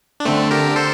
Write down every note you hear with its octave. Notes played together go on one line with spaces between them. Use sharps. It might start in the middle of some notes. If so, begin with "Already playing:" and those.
D4
D3 A3 C4
G4 A#4
A4 C5